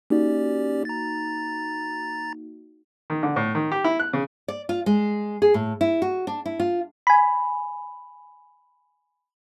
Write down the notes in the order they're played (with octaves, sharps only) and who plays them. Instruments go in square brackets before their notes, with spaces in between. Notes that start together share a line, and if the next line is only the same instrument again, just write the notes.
[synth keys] A#3 D#4 F#4 [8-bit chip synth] C#4 G4 D5
[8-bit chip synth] A#5 A6
[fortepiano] D#3
D3
A2
D#3
G4
E4
F#6
C#3
[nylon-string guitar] D5
F4
G#3
G#4
A2
E4
F#4
D4
E4
F4
[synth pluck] G#5 B5